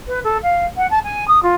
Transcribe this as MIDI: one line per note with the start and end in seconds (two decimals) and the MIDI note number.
0.07 0.19 71
0.24 0.37 69
0.42 0.65 77
0.77 0.88 78
0.90 0.99 81
1.04 1.27 80
1.27 1.42 87
1.43 1.55 65